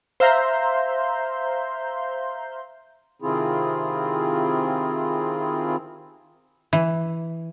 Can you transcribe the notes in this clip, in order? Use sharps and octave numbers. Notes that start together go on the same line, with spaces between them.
C5 E5 F5 A#5 C6 G6
C3 D#3 C4 E4 F4 G#4
E3